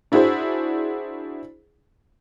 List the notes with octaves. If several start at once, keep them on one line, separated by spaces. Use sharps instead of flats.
D4 E4 F#4 G#4 C5